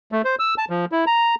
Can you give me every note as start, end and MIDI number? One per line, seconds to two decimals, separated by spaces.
0.12 0.22 57
0.25 0.35 72
0.39 0.55 88
0.58 0.65 81
0.70 0.85 53
0.92 1.05 64
1.07 1.35 82